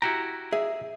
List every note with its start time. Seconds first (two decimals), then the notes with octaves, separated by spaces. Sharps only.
0.02 E4 F#4 G4 A#5
0.52 G#4 E5